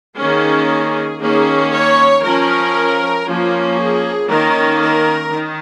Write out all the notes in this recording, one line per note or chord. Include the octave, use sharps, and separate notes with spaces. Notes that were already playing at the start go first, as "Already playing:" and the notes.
D#3 A#3 C#4 G#4
D#3 A#3 C#4 G#4
C#5
F3 C#4 A#4
F3 A#3 C#4 F4
G#4
D#3 A#3 C#4 A#4
A#4
D#3